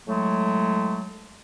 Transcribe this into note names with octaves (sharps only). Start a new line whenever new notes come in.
A2 F#3 G#3 A3